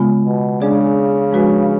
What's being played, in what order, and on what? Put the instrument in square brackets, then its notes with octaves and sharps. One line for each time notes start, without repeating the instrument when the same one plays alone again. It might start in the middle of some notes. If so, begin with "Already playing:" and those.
Already playing: [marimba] C#3 G#3 B3 F4
[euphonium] B2
[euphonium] C#3 [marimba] G#3 D4 G#4 D5
[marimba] F3 G#3 D4 F#4 B4